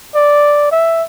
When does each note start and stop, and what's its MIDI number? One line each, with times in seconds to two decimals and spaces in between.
0.15 0.68 74
0.72 1.03 76